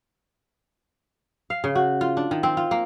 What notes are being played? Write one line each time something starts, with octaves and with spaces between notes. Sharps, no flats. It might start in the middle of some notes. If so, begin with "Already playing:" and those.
F5
C#3
F#4
F4
D4
D#3
C4
F4
A#3